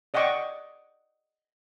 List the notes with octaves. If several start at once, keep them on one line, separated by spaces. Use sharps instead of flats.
D5 D#5 F#5 G5 C#6 D6